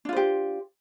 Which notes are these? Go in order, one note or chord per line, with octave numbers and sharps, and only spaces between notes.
D4 F4 G4 C5